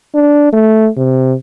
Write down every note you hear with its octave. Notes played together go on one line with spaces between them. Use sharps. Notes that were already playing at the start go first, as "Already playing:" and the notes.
D4
A3
C3